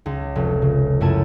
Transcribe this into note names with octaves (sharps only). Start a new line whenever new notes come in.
C#2
F1
C#3
F#2 A3 E4 G#5 A5 G#6